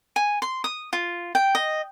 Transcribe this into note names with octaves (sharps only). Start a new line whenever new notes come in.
G#5
C6
D#6
F4
G5
D#5